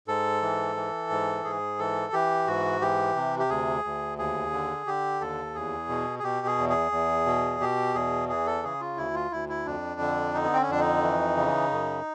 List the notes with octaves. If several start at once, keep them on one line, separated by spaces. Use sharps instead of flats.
G#2 A4
E3
E3
G#2
G#2 G#4
E3 A4
E3 G4
G#2 F#4
E3 G4
C3
G4
D2 G#4
D2
D#2 G#4
D3
D3 G4
D#2 A4
E2 G#4
B2
G#4
B2 G4
G#4
E2
G#4
E2
B2
B2 G4
E2 G#4
E3 G#4
A4
C#3 G#4
F4
D2 E4
F4
D2 E4
E4
F2 D4
D3
D3 D#4
B3
C4
C#4
F2 D4
D#4
E3
C#3
F#2